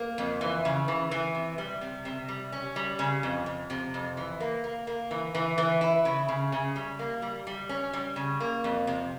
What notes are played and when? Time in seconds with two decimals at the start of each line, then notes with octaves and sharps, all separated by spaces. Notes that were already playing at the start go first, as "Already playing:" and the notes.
Already playing: A#3
0.18 F2
0.41 E3
0.65 C#3
0.88 E3
1.11 E3
1.35 C3
1.58 G3
1.81 C3
2.05 C3
2.28 G3
2.52 C#4
2.76 G3
2.99 C#3
3.23 F2
3.46 F2
3.70 C3
3.94 F2
4.17 E3
4.40 A#3
4.64 A#3
4.87 A#3
5.11 E3
5.35 E3
5.58 E3
5.81 E4
6.05 C#3
6.28 C#3
6.52 C#3
6.76 G3
6.99 A#3
7.22 G3
7.47 G3
7.69 C#4
7.93 G3
8.16 C#3
8.40 A#3
8.64 F2
8.87 C3